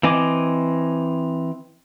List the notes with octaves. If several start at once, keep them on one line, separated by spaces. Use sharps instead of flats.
E3 C4 D#5 G#5 D6